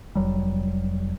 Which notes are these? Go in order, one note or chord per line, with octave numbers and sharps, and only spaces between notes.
F1 F#3 G3